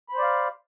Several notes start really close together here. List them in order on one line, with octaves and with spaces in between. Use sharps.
B5 C5 D5 F5